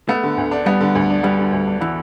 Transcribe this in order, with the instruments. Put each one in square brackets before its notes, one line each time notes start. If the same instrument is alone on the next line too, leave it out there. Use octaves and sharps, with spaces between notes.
[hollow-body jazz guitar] A3 [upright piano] B3
[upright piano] D3
D2
D4
[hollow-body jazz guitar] G3 [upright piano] B3
[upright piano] D3
D2
D4
[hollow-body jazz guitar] G3 [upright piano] B3
[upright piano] D3
D2
D4
[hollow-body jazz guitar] E3 [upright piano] B3